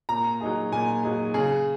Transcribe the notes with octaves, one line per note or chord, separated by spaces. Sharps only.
A#2 A#5
F#3 D#4 G#4
A#2 G#5
F#3 D#4 G#4
C#3 G#4